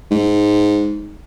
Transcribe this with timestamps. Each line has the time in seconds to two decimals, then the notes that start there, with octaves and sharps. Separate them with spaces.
0.11 G#2